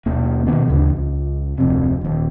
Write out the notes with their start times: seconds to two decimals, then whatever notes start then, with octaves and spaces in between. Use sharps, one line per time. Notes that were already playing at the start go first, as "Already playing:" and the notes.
0.06 D#2 B2 A#3
0.47 B2 D#3 B3
0.67 D2 G2 C#3 E3
0.96 C#2
1.58 D1 F2 C3
2.01 D#1 D#2